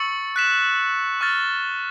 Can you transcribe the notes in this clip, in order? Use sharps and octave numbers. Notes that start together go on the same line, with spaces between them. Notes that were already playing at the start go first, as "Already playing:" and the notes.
Already playing: C#6 E6 A6 C#7 F#7
F#6 B6 E7
C#6 F6 A6